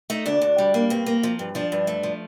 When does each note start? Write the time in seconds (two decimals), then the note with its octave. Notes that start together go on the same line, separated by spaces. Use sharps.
0.10 A3 D#4
0.26 D2 D4
0.42 D2
0.58 G3
0.74 A#3
0.90 G2 C4
1.06 A#3
1.23 F3
1.39 G2
1.55 F3 D4
1.72 G2
1.87 A3
2.03 F3